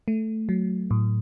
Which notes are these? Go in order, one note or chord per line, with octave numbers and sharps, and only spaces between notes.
A3
F#3
A2